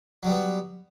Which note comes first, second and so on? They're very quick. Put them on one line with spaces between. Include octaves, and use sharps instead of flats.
F#3 G3 B3